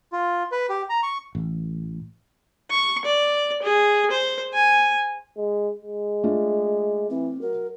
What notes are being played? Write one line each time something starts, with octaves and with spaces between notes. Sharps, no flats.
F4
B4
G4
A#5
C#6
A1
C#6
D5
G#4
C5
G#5
G#3
G#3
A3 D4 F4
E3 C4
F#3 A#4